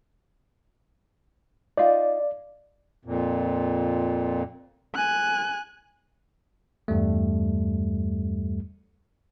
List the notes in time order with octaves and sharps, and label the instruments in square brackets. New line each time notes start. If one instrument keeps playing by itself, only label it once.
[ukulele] D#4 F4 [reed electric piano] D5
[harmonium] F2 A#2
[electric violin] G#5 F#6
[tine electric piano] E2 G2 G3 A3